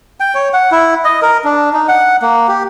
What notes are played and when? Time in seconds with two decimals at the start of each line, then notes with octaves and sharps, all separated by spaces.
0.20 G5
0.35 C#5
0.53 F#5
0.72 E4
1.05 D#5
1.22 A#4
1.44 D4
1.73 D#4
1.88 F#5
2.22 A#3
2.48 G4